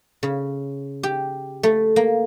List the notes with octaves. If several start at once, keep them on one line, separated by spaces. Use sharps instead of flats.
C#3
G4
A3
A#3